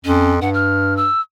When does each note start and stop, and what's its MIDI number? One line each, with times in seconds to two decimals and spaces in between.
0.05 0.41 41
0.05 0.34 61
0.41 1.09 43
0.41 0.50 78
0.54 0.96 89
0.97 1.21 88